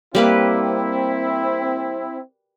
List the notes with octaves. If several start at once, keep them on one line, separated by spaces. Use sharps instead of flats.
G3 A#3 C4 E4 B4